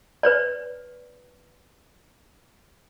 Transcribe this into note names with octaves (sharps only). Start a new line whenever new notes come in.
B4 C#5 D5